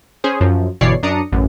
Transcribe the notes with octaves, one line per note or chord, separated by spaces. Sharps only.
C#4 G#4 C5
F#2 F3
G1 B2 E3 C#5 D5 C7
F#2 D4 A#5 D#6 C#7
A1 F#2